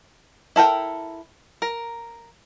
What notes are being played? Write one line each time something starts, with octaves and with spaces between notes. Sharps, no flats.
E4 A4 A#4 G5
A#4